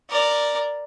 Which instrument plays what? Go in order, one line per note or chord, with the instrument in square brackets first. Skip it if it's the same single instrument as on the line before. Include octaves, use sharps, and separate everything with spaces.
[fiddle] A#4 D5